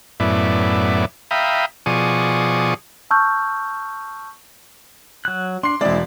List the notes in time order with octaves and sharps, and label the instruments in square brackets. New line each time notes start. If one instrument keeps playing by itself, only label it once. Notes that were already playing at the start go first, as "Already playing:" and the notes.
[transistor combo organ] F#2 A2 B3 E4 D5
E5 F5 G5 A#5 B5 D#6
B2 F3 G#4 D5 C#6 D#6
[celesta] A5 C#6 E6 F6 G6
[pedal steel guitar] F#3 F#6
[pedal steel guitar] D4 [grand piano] C6 C7
[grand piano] E1 D5 [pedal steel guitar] G#3 C4 E4